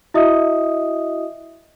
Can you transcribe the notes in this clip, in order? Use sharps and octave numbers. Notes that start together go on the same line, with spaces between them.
E4 F#4 D#5 E5 D#6